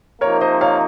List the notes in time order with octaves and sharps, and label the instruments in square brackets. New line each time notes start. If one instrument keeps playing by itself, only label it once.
[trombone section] C3 F3 A#3 D#4 [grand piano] A#4 C#5
[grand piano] C5 D#5
C#5 F5